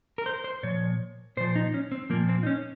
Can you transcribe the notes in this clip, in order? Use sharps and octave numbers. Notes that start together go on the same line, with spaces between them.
A#4
C5
C5
A#2 F3 C#5
A#2 F3 C5
D#4
C#4
C4
A#2 F3 A#3
C4
D#4
C#4